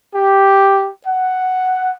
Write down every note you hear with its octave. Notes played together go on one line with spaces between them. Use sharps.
G4
F#5